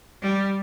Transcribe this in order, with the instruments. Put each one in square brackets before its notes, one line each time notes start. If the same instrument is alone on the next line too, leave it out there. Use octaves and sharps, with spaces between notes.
[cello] G3